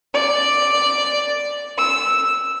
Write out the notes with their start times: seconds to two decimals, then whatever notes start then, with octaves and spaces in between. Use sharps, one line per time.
0.13 D5
1.78 E6